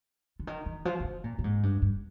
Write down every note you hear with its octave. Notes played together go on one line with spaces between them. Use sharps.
D3
D#3
D#3
F3
D3
D#3
A#2
A#2
G#2
G2
G2